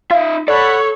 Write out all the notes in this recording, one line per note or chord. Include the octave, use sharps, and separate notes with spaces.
D#4 F4 E5
A4 C#5 D5 F#5 B5